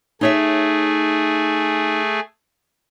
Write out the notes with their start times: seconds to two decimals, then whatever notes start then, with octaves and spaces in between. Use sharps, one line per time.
0.21 A3 D#4 G#4 C#5 E5